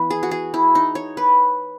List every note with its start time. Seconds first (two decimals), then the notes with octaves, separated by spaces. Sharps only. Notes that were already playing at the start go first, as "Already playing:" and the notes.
Already playing: E3 B3 B4
0.10 G#4
0.23 F#4
0.31 G#4
0.54 E4
0.75 D#4
0.95 C#5
1.17 B4